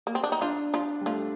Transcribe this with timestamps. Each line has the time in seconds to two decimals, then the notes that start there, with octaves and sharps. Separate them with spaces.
0.07 A#3
0.15 C4
0.24 D4
0.32 D#4
0.41 F3 D4 F4
0.74 F3 F4
1.01 G3
1.06 F3 A3 F4